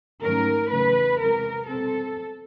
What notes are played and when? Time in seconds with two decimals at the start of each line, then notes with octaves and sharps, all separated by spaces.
0.22 G#2 D#3 F#3 A3 C#4 A#4
0.71 E2 C#3 F#3 A3 B4
1.21 C3 E3 G#3 A#4
1.69 B2 G3 C4 A4